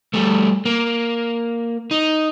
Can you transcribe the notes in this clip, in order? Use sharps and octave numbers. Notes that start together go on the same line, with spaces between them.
G3 A3
A#3
D#4